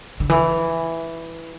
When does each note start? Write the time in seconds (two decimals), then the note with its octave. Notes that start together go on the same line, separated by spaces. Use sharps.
0.20 D3
0.29 E3